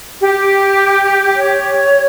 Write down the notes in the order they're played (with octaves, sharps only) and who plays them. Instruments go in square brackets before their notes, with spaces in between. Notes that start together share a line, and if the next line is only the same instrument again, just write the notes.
[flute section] G4
[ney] C#5